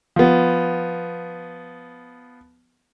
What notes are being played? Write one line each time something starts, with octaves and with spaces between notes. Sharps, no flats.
F3 B3